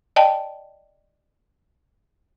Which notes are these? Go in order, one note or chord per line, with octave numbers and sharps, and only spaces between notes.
D5 D#5 G5 A5